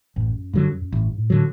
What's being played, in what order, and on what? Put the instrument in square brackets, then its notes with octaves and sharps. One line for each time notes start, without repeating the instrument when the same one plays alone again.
[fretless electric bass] A1 [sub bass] F#2
[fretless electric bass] G2 D3 F#3
[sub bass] F#2
[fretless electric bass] A1 [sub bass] G2
[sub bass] A2
[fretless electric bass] D3 F#3